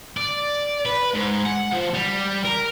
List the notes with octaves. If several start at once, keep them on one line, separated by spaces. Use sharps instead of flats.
D5
B4
G#2
F#5
F3
G3
A#4